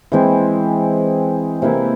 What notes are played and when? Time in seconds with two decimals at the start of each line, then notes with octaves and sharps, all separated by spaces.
0.12 E3 G#3 C4
1.62 C3 E3 A#3 E4